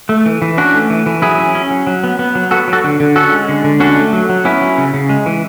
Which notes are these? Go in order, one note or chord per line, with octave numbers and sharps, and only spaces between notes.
A3
E3
E3
C#4 D4 F#4
A3
E3
E3
F#3 E4 G#4
C#4
C#4
F#3
F#3
B3
B3
F#3
B3 F#4 A4
F#3
F#4 A4
D3
D3
C#4 F#4 A4
G#3
D3
D3
C#4 D4 F#4
A3
F#3
F#3
B3 C#4 E4
F#3
C#3
C#3
G#3
E3